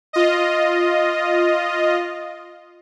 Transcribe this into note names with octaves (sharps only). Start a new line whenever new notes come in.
F4 D#5